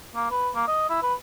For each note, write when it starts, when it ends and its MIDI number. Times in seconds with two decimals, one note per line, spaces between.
0.16 0.30 58
0.31 0.50 71
0.55 0.64 58
0.67 0.89 75
0.89 1.01 64
1.03 1.14 71